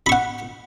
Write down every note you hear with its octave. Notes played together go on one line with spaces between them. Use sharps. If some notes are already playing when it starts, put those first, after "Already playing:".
F#5 B5 C#6